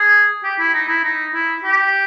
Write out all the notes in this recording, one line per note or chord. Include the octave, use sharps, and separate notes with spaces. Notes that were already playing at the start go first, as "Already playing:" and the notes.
Already playing: G#4
G4
E4
D#4
E4
D#4
E4
G4